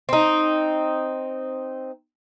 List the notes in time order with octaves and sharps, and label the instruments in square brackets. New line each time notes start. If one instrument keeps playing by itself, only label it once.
[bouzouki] C4 D#4